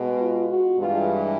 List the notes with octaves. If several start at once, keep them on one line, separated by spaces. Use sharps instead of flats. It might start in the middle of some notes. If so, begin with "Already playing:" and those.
Already playing: B2 G#3
F4
F#4
G2 E3 G#3 F4